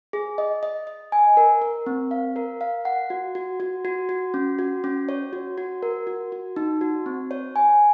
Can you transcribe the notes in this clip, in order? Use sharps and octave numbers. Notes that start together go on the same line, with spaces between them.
G#4
D#5
D#5
D#5
G#5
A#4
A#4
C4
F5
A#4
F5
F#5
F#4
F#4
F#4
F#4
F#4
C#4
F#4
C#4
C#5
F#4
F#4
A#4
F#4
F#4
D#4
F#4
C4
C#5
G#5